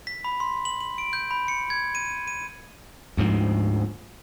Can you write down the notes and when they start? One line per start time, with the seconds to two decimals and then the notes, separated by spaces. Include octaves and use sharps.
0.07 B6
0.24 B5
0.40 C6
0.65 F#7
0.81 F#7
0.98 D7
1.13 G6
1.31 B5
1.48 C#7
1.70 G#6
1.95 D#7
2.27 D#7
3.17 D2 G#2 F3